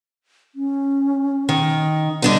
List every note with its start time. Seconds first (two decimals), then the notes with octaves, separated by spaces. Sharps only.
0.55 C#4
1.49 D#3
2.22 D3 G3 D4 D#4